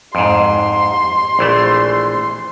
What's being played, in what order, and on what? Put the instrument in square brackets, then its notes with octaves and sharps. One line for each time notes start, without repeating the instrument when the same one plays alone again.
[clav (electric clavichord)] F2 G#2 [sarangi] C6
[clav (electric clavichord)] A#1 E3 A3